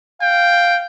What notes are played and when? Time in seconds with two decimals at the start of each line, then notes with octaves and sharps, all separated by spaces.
0.21 F5 G5